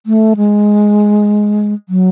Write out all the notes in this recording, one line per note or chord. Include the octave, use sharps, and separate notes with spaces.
A3
G#3
F#3